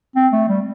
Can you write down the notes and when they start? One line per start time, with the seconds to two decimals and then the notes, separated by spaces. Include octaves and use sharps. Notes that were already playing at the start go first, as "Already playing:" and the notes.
0.16 C4
0.33 A3
0.48 G3